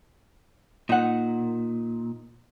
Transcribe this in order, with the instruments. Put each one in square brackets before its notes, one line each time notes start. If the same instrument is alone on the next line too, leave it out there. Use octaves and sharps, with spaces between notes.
[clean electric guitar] A#2 [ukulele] D#4 F#5